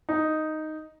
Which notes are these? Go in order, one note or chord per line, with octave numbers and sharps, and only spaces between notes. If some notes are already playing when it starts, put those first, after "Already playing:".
D#4